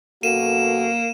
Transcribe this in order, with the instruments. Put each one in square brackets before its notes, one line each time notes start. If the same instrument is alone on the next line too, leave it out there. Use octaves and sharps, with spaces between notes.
[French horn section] F#2 B2 A4 [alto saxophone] A#3 [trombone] F#4 [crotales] D#7 E7